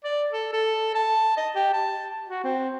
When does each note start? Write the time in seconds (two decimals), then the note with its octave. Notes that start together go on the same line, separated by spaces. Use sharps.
0.04 D5
0.33 A4
0.53 A4
0.95 A5
1.37 D#5
1.56 G4
1.73 A5
2.29 F#4
2.44 C4